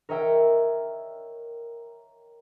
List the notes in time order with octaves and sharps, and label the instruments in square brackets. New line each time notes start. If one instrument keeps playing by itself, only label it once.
[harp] A#4 C#5 D#5 E5 G5